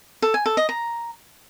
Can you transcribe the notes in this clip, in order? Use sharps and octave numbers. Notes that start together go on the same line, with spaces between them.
A4
G#5
A4
D#5
A#5